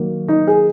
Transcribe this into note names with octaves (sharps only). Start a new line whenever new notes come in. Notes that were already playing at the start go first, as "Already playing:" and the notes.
Already playing: D#3 F#3 A#3
D#4
G#4